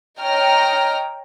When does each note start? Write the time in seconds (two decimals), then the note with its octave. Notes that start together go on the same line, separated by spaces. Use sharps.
0.20 C#5 D#5 G5 A#5 F6